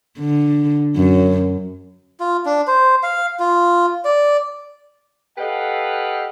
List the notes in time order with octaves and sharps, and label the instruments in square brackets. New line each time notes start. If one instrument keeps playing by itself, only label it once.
[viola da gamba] D3
F#2
[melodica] F4
D4
C5
F5
F4
D5
[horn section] G4 A4 B4 D#5 F5 F#5